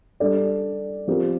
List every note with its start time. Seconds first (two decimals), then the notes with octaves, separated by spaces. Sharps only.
0.20 G3 D4 A4 D5
1.08 F3 C4 G4 A#4